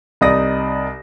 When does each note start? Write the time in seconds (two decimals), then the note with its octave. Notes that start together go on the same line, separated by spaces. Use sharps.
0.21 C2 D#4 D5 D#6 A#6